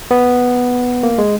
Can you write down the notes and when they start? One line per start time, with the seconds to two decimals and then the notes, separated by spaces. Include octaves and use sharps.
0.11 B3
1.03 A#3
1.18 G#3